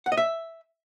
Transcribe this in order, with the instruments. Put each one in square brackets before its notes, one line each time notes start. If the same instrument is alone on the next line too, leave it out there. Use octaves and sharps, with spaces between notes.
[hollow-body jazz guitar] F#5
D#5
E5